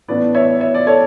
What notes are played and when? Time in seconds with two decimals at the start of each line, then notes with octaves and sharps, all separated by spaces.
0.08 A2 E3 B3 D4 B4 D5
0.34 C#5 E5
0.60 C#5 E5
0.74 D5
0.86 A4 C#5